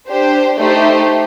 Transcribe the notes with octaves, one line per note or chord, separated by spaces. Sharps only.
D4 G4 C5
A3 D#4 G4 C5